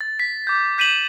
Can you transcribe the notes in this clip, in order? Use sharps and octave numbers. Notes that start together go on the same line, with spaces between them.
A6
B6
D6 G6
G6 B6 D#7 E7 F#7